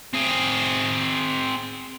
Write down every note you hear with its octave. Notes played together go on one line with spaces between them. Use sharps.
C4 G#4